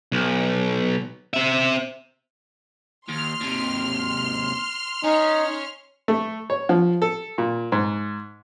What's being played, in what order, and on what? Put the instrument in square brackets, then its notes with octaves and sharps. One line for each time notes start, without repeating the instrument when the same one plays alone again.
[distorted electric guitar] B1
C4 E5
[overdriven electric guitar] D#2 [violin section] C6 F6
[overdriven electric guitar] D#2 C3
[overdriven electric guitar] C#4 [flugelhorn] D#4
[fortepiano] A3
C#5
F3
A4
A#2
G#2